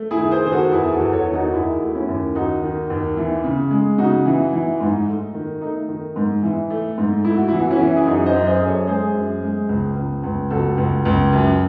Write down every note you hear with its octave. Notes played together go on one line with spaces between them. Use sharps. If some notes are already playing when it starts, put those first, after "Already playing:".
Already playing: A3
E4 G#4
D#3
G#4 C5
D#3 C5
F#4 A4
E2 E4 G#4
F#4 A4
E2
A4 C#5
D#3
D#4 F#4
D#2 E4 G#4
A3 F#4
C#4 E4
D#2
D#2 D#4 F#4
D#3
D#2
E3
C#3
G#3
C#3 D#4 F#4
E3
E3
G#2
A3
D#3
A3 D#4
D#3
G#2
E3
A3
G#2
A3 E4
F#4
E3 E4
F#4
C#4 E4
E3
G#4
F#2 D#4 F#4
C5 D#5
F#2
G#4 C5
F#2
A4 C#5
G#3 G#4 C5
F#2
G#3
C#2
C#2
C#2
C#2 F#4 A4
C#2
C#2
F#2